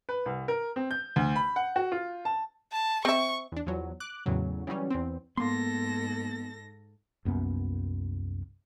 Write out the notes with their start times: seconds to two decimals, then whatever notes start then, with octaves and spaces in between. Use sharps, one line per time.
0.09 B4
0.26 C2
0.48 A#4
0.76 C4
0.91 G6
1.16 D2
1.36 B5
1.56 F#5
1.76 F#4
1.92 F4
2.25 A5
2.72 A5
3.05 C4 E5 C#6
3.52 E2 D4
3.66 E2 F3 F#3
4.00 D6 F#6
4.26 E2 A2 C#3 F#3
4.67 C#3 E3 F#3 G3 C#4
4.90 E2 C4
5.37 G#2 A#3 B3 A4 C6 A#6
7.25 C2 F#2 A#3 B3